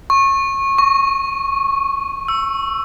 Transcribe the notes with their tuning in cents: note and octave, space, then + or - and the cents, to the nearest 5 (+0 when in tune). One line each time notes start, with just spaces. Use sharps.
C#6 -25
C#6 +15
E6 +15